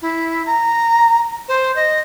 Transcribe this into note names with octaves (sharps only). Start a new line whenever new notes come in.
E4
A#5
C5
D#5